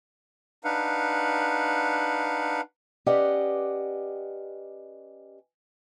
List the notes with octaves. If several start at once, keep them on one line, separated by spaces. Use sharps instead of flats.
D4 D#4 B4 F5 F#5
C#4 G4 B4 D5 D#5 F#5